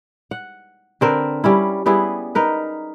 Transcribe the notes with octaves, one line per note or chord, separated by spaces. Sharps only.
F#5
D3 C4 A#4 B4
G3 C#4 E4
G3 B3 E4 G#4
D#4 A#4 B4